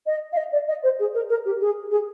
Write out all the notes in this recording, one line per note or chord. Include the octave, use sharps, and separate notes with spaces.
D#5
F5
D#5
D5
D#5
C5
G#4
A#4
A#4
G4
G#4
G#4